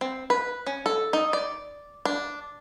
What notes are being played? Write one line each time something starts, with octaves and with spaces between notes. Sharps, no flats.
C4
B4
C#4
A4
D#4
D5
D4